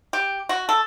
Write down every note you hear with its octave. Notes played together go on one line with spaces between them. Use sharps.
G4
F#4
A4